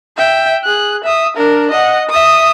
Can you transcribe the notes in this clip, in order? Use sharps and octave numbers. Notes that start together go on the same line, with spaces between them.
E5 G5
G#4 F#6
E5 D#6
D4 A#4
D#5 F#5
E5 D#6